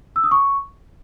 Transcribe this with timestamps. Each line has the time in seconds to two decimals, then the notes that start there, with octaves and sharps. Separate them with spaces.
0.16 E6
0.24 D#6
0.31 C#6